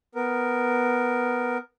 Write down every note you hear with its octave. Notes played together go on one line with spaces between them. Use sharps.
B3 A#4